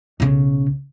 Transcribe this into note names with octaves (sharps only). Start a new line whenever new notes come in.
B1 C#3